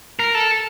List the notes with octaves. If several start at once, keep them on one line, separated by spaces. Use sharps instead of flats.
A#4
A4